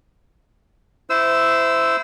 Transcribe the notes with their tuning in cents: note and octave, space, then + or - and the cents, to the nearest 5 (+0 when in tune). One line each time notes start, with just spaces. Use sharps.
E4 +0 C5 -20 E6 +0